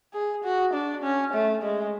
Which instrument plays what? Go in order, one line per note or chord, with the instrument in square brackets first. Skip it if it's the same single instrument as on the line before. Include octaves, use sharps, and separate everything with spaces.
[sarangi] G#4
F#4
D4
C#4
A3
G#3